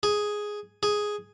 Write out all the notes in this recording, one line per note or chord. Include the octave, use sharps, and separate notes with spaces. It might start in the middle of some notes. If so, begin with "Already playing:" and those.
G#4
G#4